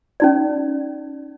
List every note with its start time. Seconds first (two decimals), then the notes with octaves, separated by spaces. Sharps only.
0.20 C#4 D#4 D5